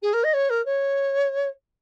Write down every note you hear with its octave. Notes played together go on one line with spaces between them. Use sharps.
G#4
A#4
D#5
C#5
A#4
C#5